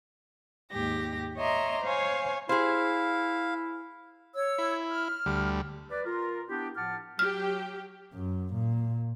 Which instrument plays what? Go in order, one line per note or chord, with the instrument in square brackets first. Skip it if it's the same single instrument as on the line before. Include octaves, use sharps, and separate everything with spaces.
[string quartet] D#2 G#2 G4 A#6
C#5 D#5 E5 A#5 C6 D6
C5 C#5 F5 G#5
[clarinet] E4 [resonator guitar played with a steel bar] G#4 C5 [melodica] F5
[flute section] C#5 E6
[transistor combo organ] E4
[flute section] F6
[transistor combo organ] D2 G3
[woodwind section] B4 D5
F4 A#4
B3 D4 E4 G4
A2 F3 F#5 A5 D6 F6
[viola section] F#3 G4 G5 [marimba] F6
[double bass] F#2
A#2